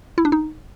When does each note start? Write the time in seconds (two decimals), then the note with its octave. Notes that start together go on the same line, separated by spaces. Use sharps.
0.18 E4
0.25 D4
0.32 D#4